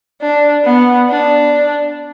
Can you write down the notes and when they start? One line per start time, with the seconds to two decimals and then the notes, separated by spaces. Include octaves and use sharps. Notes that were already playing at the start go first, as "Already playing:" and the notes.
0.22 D4
0.65 B3
1.10 D4